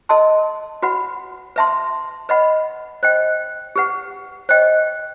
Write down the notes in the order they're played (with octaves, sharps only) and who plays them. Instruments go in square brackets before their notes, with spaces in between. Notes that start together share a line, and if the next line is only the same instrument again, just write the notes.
[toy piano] A4 D#5 A5 C6
F#4 B4 F#5 B5
B4 E5 A5 C6
B4 D#5 F#5 B5
C5 D#5 G5
G4 B4 F#5
C5 D#5 G5